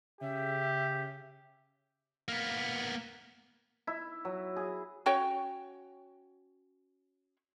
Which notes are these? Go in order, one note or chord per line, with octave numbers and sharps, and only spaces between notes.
C#3 G4 E5
A#3 B3
E4
F#3
G#4
C#4 F#4 C#5 G5